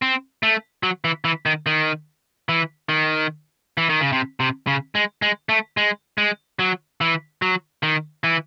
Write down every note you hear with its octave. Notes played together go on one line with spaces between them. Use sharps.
C4
A3
F#3
E3
E3
D#3
D#3
E3
D#3
E3
D#3
C#3
C3
C3
C#3
G#3
G#3
A3
G#3
G#3
F#3
E3
F#3
D#3
E3